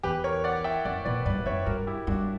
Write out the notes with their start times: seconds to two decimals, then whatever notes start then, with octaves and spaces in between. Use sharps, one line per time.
0.03 E2 G4 B4
0.24 A#4 C#5
0.44 D5 F#5
0.64 E5 G5
0.85 F#2 D5 F#5
1.05 A#2 B4 D5
1.25 G2 B4 D5
1.45 F#2 C#5 E5
1.66 G2 F#4 A#4
1.87 E4 G4
2.07 G2 D4 F#4